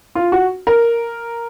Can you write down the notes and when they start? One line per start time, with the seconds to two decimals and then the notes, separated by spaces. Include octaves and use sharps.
0.15 F4
0.32 F#4
0.67 A#4